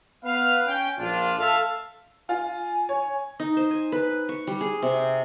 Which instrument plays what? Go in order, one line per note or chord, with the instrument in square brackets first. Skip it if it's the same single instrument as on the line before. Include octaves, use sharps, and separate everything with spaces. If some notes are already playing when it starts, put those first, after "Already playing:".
[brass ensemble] B3 B4 F5
C#4 G5
A#1 D4 F4
A4 E5 F5
[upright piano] F4 [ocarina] G#5
[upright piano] C#5
[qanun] D#4
C5
G#5
B4
C#6
G3
G#4
C3